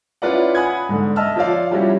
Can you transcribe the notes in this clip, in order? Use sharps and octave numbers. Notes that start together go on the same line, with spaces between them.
C#4 E4 F4 B4 D5 F#5
F#5 G#5 B5 D#6 F#6 G#6
G#2 D3
D#5 E5 A5 E6 F6
F3 F4 C#5 D5 F5
F3 G3 C#4 E4 F#4 G4